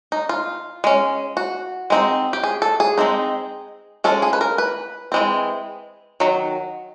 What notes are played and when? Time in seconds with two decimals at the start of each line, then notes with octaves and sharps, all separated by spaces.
0.12 D#4
0.29 F4
0.84 G#3 C#4
1.37 F#4
1.90 G#3 C4 D#4
2.33 G4
2.44 G#4
2.62 A4
2.80 G#4
2.98 G#3 C4 D#4
4.04 F3 G#3 C#4 A4
4.22 G#4
4.33 B4
4.41 A#4
4.58 B4
5.12 E3 G#3 C4
6.20 D#3 F#3